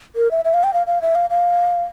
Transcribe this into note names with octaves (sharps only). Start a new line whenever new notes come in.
A#4
E5
E5
F5
G5
F5
F5
E5
F5
F5